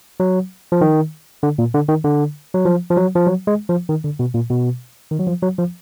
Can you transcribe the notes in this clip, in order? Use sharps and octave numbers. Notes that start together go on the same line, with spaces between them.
F#3
F3
D#3
D3
A#2
D3
D#3
D3
F#3
F3
F3
F#3
F3
F#3
G#3
F3
D#3
D3
B2
A#2
B2
D#3
F#3
F3
F#3
F3